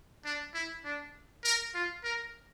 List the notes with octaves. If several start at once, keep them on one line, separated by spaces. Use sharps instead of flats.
D4
E4
D4
A#4
F4
A#4